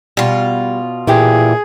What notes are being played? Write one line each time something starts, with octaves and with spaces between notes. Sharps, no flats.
B2 G3 F4
A#2 E3 E4 G4 G#4